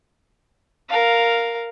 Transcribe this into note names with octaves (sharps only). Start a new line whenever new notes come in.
A#4 F5